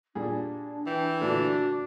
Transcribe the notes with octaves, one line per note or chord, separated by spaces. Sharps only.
A#2 G3 D4 G#4
E3 G5
A#2 D3 A3 D4 F#4